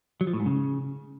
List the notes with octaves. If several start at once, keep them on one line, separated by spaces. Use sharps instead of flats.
F#3
F3
A2
G#2
C#3